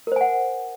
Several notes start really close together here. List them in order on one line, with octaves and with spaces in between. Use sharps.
A#4 C5 G#5 F#5